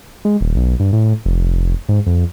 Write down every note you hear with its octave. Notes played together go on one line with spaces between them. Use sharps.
G#3
D#1
B1
G2
A2
F1
G#2
F2